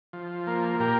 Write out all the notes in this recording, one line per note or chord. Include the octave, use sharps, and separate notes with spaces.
F3
A#3
A#2 G4 A#4